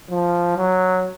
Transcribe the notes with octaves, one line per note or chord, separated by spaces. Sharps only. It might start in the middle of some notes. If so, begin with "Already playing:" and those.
F3
F#3